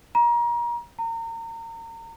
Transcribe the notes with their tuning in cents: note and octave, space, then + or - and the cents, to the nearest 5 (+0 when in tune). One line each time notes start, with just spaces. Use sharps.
A#5 +30
A#5 -30